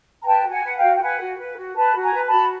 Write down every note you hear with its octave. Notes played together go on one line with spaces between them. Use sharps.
A#5
B4 G5 A5
F#4
F#5 G#5
B4 F#5
F5 G5
F#4
G5
B4 F#5 G#5
F#4
B4
F#4
B4 A5 B5
F#4
G#5 A#5
B4
A5 B5
F#4